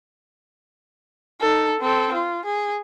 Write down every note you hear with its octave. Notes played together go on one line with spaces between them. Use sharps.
D#4 A4
C4 A4
F4
G#4